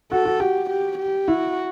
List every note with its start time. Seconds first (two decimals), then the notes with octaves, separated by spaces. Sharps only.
0.12 F#4 A4
0.25 F#4
0.40 F#4 G4
0.70 G4
0.99 G4
1.28 E4 F#4